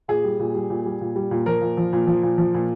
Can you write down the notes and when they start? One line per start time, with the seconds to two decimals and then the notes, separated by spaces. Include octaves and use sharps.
0.08 A#2 G#4
0.24 G3
0.39 A#2
0.54 G3
0.70 A#2
0.86 G3
1.01 A#2
1.16 G3
1.31 A#2
1.46 F3 A#4
1.61 A#2
1.77 F3
1.93 A#2
2.07 F3
2.23 A#2
2.38 F3
2.54 A#2